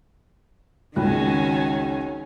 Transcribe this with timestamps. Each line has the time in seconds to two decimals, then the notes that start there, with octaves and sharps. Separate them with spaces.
0.96 G#1 C#2 D#3 C#4 F#4 F#6